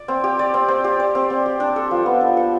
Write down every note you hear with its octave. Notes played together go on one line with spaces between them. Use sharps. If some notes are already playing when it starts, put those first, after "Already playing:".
Already playing: D5
C4
G4
D5
C4
C4
G4
D5
C4
C4
G4
D4
A4
F3
B3
D4
A4